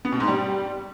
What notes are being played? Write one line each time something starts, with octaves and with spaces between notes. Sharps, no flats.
B3
B2
G#2
G3